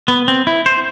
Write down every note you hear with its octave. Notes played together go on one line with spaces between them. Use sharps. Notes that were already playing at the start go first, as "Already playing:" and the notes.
B3
C4
E4
C5